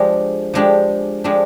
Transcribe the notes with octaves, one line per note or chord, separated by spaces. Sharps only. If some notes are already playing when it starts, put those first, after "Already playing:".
Already playing: F3 G#3 D4 G4
F3 G#3 D4 G4
F3 G#3 D4 G4